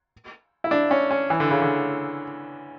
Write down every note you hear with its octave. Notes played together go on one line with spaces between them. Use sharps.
E4
D4
C#4
C#4
E3
D3
C#3
D3